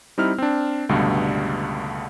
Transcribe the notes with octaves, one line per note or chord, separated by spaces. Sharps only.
G3 C4 D#4 E4 F6
C4 D4
C#2 G2 B2 D3 G3 A3